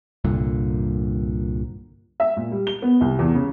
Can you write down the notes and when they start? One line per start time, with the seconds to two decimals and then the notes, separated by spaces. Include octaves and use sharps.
0.24 C2 G2 A#2 D3
2.20 E5
2.36 A#2
2.51 G3
2.67 G7
2.82 B3
3.01 C2
3.19 E2
3.35 C#3